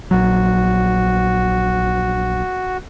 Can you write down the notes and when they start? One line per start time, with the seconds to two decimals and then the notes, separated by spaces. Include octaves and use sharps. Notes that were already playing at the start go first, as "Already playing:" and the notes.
0.11 A#1 F#3 F#4